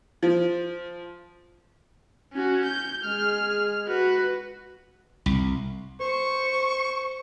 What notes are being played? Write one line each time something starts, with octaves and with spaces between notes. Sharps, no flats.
F3
C#4 F#4
G6
G#3 G#4 F6
F#4 B4
C2
C5 C#6